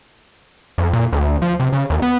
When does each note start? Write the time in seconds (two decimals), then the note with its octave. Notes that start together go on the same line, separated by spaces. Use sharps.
0.78 F2
0.93 A#2
1.13 D2
1.42 F3
1.60 C3
1.73 C#3
1.90 D#2
2.02 B3